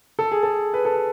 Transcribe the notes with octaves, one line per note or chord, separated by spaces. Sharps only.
A4
G#4
A4
B4
A4